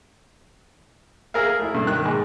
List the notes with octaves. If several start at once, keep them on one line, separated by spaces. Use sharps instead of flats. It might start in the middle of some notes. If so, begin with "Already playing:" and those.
G#4 A#4 E5 F5
A3 E4
G2
D#3 F#6
G#2